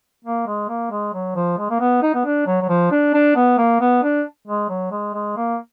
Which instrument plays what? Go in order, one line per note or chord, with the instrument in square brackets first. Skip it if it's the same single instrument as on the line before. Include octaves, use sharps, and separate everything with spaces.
[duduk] A#3
G#3
A#3
G#3
F#3
F3
G#3
A#3
B3
D#4
B3
D4
F#3
F#3
F3
D4
D4
B3
A#3
B3
D4
G#3
F#3
G#3
G#3
A#3